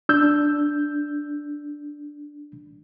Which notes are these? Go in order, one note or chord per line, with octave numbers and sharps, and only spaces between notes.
D4 E6 G6